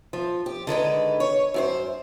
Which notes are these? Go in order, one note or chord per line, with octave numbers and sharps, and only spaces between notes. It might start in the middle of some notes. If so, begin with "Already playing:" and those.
F3
G4
D3 D#3 G#3 B4
C#5
F#2 F#4 C5